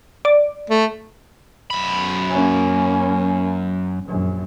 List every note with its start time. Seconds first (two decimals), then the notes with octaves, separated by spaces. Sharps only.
0.25 D5
0.70 A3
1.70 F#2 B5
2.30 A#3 C#4
4.06 A#1 F#2